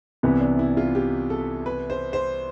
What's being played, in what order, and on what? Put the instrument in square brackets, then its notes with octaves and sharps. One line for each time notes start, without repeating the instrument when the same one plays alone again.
[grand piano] C2 C3 E3 B3 [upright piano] E4
[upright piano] D4
E4
F4
G4
A4
B4
C5
C5